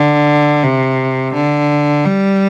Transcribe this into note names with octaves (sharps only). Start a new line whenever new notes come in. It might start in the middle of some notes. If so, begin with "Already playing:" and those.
Already playing: D3
C3
D3
G3